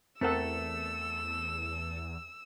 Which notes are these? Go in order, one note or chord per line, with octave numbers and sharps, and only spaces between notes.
E2 A3 C4 A4 A#4 F#5 E6